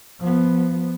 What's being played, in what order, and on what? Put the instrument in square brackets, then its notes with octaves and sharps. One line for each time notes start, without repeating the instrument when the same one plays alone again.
[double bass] F3 B3